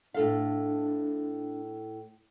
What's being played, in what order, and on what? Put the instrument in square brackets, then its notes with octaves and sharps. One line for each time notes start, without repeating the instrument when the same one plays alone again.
[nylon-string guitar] A2 A4 F5 [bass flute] D4